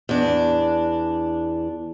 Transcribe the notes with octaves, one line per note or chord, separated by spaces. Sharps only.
E2 D4